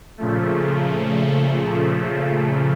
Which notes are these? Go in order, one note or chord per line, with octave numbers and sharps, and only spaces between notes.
A#2 C#3 F3 A3